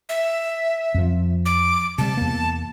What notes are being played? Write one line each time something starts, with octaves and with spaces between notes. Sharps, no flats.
E5
F2 F3
D6
C3 G3 A5
E2 A#3